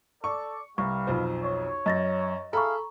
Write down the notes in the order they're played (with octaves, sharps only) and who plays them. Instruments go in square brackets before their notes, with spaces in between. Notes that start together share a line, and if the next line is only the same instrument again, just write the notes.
[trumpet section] A4 D5 [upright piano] C#6
[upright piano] C2 [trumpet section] G3 B4 F5 [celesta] C#6
[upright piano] B1 F2 C5
[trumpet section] C#5
[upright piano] F#2 [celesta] D#5 A6 A#6
[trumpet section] E4 G#4 F5 [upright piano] A4 B5 [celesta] A#5 C#6